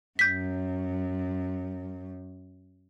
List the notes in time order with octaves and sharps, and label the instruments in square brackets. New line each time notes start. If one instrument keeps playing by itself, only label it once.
[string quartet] F#2 [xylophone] G6 B6